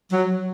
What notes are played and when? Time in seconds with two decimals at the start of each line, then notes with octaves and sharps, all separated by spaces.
0.13 F#3